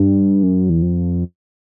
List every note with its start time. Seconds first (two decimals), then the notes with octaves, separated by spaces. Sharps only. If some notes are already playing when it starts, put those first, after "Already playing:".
Already playing: G2
0.43 F#2
0.70 E2
0.82 F2